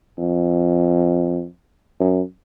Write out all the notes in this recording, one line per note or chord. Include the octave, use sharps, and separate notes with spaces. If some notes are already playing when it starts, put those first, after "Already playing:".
F2
F#2